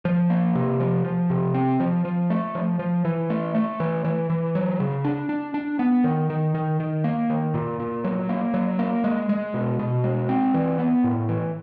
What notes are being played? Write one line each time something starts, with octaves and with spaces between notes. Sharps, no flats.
F3
A#3
C3
F3
F3
C3
C4
F3
F3
A3
F3
F3
E3
A3
A3
E3
E3
E3
F#3
C#3
D4
D4
D4
B3
D#3
D#3
D#3
D#3
A#3
D#3
A#2
A#2
F#3
A#3
F#3
A#3
G#3
G#3
B2
B2
G#3
C4
E3
B3
A2
E3